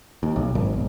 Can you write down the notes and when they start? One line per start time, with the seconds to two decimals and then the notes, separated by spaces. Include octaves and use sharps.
0.23 D#2
0.36 B1
0.55 G#1
0.73 B1